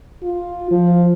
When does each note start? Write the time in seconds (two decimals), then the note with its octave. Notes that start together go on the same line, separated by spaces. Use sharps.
0.24 F4
0.71 F3